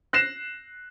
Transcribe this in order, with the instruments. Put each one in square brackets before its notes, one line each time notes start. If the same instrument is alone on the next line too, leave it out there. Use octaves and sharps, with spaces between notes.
[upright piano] F#6 A#6 C7 E7